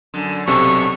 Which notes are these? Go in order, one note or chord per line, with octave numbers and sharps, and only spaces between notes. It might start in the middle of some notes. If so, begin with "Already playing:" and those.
F#2 D3
B1 C3 C#4 F#4 A4 C#6